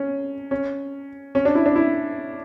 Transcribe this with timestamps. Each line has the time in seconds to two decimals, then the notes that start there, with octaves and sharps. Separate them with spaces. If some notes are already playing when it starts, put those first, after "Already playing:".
Already playing: C#4
0.51 C#4
1.35 C#4
1.45 D4
1.55 E4
1.66 D4
1.75 E4